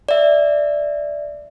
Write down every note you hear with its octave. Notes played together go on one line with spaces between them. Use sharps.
D5 E5